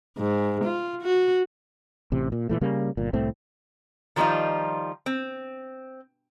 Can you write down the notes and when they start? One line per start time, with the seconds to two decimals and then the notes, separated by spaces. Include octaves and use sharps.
0.18 G#2
0.65 F4
1.03 F#4
2.12 A1 C3
2.32 A#2
2.49 A#2 E3 A3
2.61 C#3 G3 A#3
2.97 G1 A#2
3.13 C2 A2 A3 C4
4.16 D#3 F3 G3 B3 D#4 F4
5.06 C4